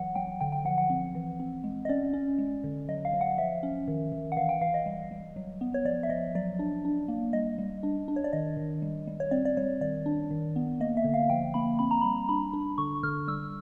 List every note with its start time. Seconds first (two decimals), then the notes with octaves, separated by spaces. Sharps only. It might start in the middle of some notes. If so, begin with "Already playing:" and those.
Already playing: E3 F#3 F#5
0.15 F#3 G5
0.41 D3 G5
0.52 G5
0.65 F3 F#5
0.78 F#5
0.90 C4
1.15 E3
1.40 C4
1.64 G#3
1.85 D#5
1.89 C#4 D5
2.13 C#4
2.38 G#3
2.64 D3
2.89 F#3 D#5
3.05 F5
3.13 F#3
3.21 F#5
3.38 F3 E5
3.63 C#4
3.88 D#3
4.12 D#3
4.32 F#5
4.37 E3 F5
4.49 G5
4.61 E3 F5
4.74 D#5
4.86 G3
5.11 G3
5.36 F#3
5.61 B3
5.74 C#5
5.85 F3 D5
6.03 E5
6.09 F3 D#5
6.35 F#3 D5
6.59 D4
6.85 D4
7.08 A#3
7.33 G3 D#5
7.58 G3
7.83 D4
8.08 D4
8.16 C#5
8.24 D5
8.33 D#3 D#5
8.57 D#3
8.82 G3
9.07 G3
9.20 C#5
9.31 C4 D5
9.45 D5
9.57 G3 C#5
9.81 D#3 D5
10.06 D4
10.31 D#3
10.56 B3
10.80 A#3 D#5
10.97 E5
11.04 D3
11.14 F5
11.30 F3 G5
11.54 A#3 B5
11.79 C4 B5
11.91 A#5
12.01 G3 B5
12.29 D4 B5
12.53 D4
12.78 D3 C#6
13.03 D3 F6
13.28 G3 E6